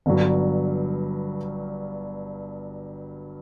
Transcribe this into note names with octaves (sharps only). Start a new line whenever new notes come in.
G1 G2 F#3